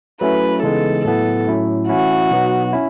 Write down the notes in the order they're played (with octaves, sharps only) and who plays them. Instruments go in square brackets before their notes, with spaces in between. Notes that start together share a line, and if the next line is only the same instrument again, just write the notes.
[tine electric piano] F#3 A3 C#4 E4 [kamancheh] B4
[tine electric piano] C#3 E3 G#3 B3 D#4 [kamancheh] A4
[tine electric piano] A2 F#3 B3 E4 [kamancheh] A4
[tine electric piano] A2 F#3 C#4 E4
[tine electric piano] E3 A3 C#4 E4 [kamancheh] F#4
[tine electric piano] B2 F#3 B3 D#4
C#4 E4